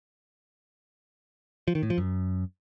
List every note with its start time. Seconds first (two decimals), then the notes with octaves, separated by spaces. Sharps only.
1.68 F3
1.75 D#3
1.83 A2
1.90 F3
1.98 F#2